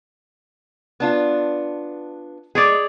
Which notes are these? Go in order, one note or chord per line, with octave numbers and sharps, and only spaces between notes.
B3 D4 F4
G#3 G#4 C#5 D5